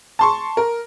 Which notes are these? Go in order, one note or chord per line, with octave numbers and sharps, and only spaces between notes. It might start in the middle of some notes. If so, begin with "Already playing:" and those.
A5 C6 C#6
A#4